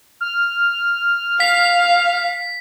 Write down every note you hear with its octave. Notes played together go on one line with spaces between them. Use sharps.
F6
F5 B6